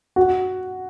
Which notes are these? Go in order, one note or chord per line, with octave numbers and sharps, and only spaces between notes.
F#4